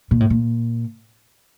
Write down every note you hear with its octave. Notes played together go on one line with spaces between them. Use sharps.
A#2
A2
A#2